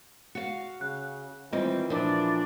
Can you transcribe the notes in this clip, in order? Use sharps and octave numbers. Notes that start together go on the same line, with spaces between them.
F#4 F5 C#7
C#3 F#6
D#3 E3 G3 C4 F4 D#5
A#2 F3 D4 A#4